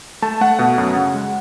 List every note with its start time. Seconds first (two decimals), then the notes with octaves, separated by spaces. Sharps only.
0.22 A3 A5
0.41 A3 F#5
0.59 B2 F#5
0.78 F#2
0.96 C#3
1.14 G#3